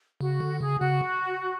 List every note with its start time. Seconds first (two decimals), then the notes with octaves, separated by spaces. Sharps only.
0.21 C#3 F#4
0.40 D3
0.61 C#3 G#4
0.80 C#3 F#4